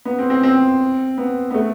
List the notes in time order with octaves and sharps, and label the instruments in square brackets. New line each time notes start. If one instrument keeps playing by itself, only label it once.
[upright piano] B3
C4
C4
C4
B3
B3
A3